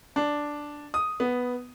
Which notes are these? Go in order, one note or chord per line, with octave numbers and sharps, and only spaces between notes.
D4
D#6
B3